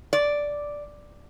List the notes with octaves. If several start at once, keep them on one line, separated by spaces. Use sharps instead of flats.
D5